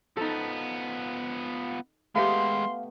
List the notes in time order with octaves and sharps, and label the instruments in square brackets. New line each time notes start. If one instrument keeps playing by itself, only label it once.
[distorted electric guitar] F3 B3 [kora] D#4 A4
[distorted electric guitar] G#3 G5 [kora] A3 B3 G4 [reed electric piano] F5 [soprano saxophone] C6